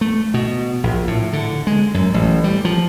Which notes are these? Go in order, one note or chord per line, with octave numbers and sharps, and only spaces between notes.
A3
B2
A#1
A2
D3
G#3
F#2
A1
G3
F3